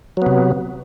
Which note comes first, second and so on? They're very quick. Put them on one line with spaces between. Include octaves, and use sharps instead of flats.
F#3 B3 C3